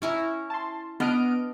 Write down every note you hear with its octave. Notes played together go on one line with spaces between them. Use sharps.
C#4 E4 A#5
A5 C6
B3 D4 D#5 F6 D7